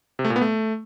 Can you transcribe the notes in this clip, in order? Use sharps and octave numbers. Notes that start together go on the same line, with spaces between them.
C3
A3
A#2
B3
A3